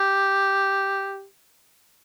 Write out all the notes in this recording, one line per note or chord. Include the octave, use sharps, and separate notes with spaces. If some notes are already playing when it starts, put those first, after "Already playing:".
Already playing: G4